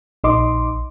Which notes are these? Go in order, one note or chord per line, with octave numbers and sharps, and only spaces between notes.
A#1 D#4 D#5 C6 D6